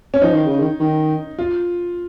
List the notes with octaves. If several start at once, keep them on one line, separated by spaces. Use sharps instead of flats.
C#4
F3 D#4
D#3
C#3
D#3
D#3
F4